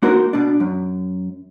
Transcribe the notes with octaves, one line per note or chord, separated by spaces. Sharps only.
A#3 D#4 F#4 A#4 C5
B2 D4
F#2